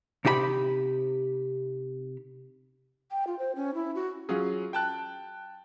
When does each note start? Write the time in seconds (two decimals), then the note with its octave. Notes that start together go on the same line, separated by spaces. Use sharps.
0.25 C3 D#4 G4 E5 B5
3.11 G5
3.27 F4
3.39 C5
3.56 C#4
3.74 E4
3.95 F#4
4.29 F#3 C#4 F4 G#4
4.73 G5 A5 F#6